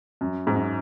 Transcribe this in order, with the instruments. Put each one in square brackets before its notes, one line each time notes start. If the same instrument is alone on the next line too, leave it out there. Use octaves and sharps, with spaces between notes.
[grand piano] F#2
G#2
F#2